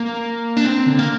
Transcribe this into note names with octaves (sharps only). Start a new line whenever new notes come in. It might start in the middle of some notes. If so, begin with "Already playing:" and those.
Already playing: A#3
D4
C4
D3
A#3